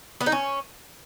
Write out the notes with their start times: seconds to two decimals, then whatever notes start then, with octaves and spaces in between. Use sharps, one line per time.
0.21 B3
0.26 D#4
0.32 C#4